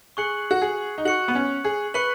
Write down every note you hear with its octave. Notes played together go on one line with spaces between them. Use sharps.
G#4 C#6 F#6 C#7 F#7
F#4
G#4
D#4
F#4 C#6 F#6 C#7 F#7
B3
C#4
G#4
B4 C#6 F#6 C#7 F#7